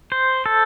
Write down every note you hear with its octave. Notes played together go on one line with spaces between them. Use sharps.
C5
A4